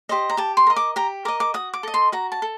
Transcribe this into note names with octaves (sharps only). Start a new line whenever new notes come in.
G4 C5 D#5
A#5
G4 A5
C6
A#4 D#5
D6
G4 A#5
A#4 D#5 D6
D6
F#4 D#6
D6
A4 D#5
C6
F#4 A#5
A5
A4